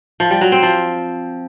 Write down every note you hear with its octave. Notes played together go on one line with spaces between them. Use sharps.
F3
G3
F#3
C4
F3